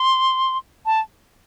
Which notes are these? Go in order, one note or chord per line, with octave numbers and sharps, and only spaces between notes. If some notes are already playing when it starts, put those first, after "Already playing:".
Already playing: C6
A5